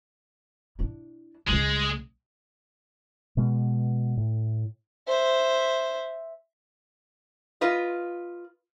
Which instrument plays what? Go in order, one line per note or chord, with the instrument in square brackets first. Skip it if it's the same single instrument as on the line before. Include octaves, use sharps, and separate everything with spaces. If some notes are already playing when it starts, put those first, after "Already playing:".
[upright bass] D4 E4
[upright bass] C#2 C#3 [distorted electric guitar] G#3
[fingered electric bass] B2 G#3 B3
A2
[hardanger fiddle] C5 E5
[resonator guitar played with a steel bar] F4 B4 D#5